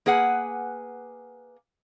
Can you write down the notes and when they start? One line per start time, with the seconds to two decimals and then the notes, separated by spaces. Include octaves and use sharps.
0.06 A#3 G#4 B4 F#5 G#5